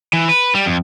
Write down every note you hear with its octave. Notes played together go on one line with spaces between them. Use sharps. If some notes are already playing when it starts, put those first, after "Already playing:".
E3
B4
G3
F2